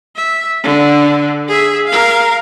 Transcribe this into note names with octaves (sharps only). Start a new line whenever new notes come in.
E5
D3
G#4 E5
A#4 F5